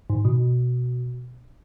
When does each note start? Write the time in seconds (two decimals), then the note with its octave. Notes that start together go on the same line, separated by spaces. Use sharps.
0.10 G#2
0.25 B2